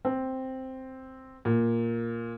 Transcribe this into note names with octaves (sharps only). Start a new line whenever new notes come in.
C4
A#2